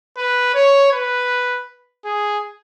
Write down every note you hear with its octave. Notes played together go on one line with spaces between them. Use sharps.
B4
C#5
B4
G#4